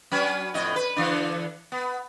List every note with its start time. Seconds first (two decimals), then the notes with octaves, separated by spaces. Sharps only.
0.12 F#3 C#4 B4
0.54 F2 A2 D#5
0.76 B4
0.96 D3 E3 D4
1.72 B3